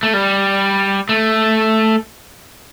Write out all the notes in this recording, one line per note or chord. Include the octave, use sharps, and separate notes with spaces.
A3
G3
A3